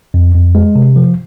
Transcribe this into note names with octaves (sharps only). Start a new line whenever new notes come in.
F2
F2
G#3
C3
F3